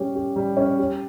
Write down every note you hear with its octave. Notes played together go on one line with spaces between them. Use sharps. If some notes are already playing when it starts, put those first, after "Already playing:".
Already playing: G3 C#4 G4
G4
G3
C#4
G4